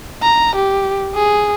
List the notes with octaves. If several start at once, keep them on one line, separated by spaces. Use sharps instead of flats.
A#5
G4
G#4